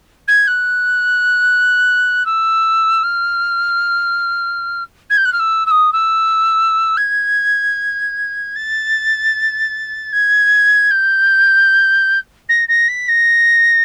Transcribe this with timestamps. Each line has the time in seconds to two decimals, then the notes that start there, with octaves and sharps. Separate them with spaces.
0.28 G#6
0.47 F#6
2.26 E6
3.03 F6
5.10 G#6
5.17 G6
5.25 F#6
5.32 F6
5.39 E6
5.66 E6
5.71 D#6
5.92 E6
6.97 G#6
8.55 A6
10.12 G#6
10.91 G6
12.49 A#6
12.68 A#6
12.88 B6
13.08 A#6